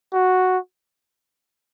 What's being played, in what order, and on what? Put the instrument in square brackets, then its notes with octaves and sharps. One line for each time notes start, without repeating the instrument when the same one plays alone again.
[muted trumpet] F#4